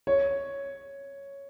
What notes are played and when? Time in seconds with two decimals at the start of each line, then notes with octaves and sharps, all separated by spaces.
0.07 C#5